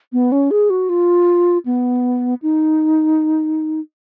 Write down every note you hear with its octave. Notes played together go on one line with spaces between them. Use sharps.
B3
C#4
G#4
F#4
F4
B3
D#4